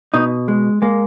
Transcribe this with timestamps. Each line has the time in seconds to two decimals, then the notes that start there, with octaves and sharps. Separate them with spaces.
0.14 B2 D#4
0.48 G#3
0.82 G#3 A#3